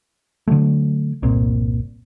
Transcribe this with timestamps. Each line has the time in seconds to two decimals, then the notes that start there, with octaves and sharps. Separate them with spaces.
0.48 D3 F3 F#3 A3
1.22 G1 C2 A#2 C4